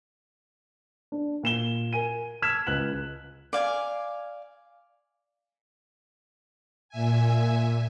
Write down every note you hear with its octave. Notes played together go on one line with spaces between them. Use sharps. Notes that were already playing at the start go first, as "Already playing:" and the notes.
D4
A#2 E7 G7
A#4 G#5 D#7
A5 E6 F6 G#6 B6 E7
C#2 F#6 F#7
D5 F5 G#5
A#2 E5 G#5